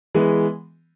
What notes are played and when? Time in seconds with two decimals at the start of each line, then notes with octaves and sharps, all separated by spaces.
0.15 E3 G#3 B3